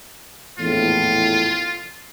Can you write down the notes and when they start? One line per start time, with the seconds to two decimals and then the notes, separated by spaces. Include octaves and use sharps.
0.59 A#1 E2 A2 F4